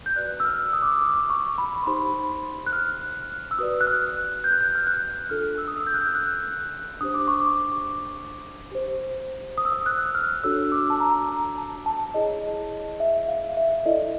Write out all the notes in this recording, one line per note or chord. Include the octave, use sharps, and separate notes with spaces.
G6
F#4 B4 D5 F#6
E6
F6
D#6
D6
D#6
D6
C#6
B5
C6
D#4 G4 C5 B5
F#6
F6
E6
F#4 B4 D5 D#6
F#6
F6
G6
F#6
G6
F6
F#6
D4 F4 A4 F6
E6
D#6
E6
G6
F#6
G6
F#6
D4 G4 C5 D#6
D6
C#6
D6
G4 C5
D#6
E6
D#6
F#6
F6
D4 F#4 A4 C#5 E6
D6
A5
A#5
A#5
A5
A5
E4 G#4 C#5 D#5
E5
F5
E5
E4 A4 D5 D#5